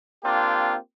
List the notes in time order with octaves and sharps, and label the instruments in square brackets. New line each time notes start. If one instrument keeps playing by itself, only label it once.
[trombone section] A#3 C4 D4 F4 G4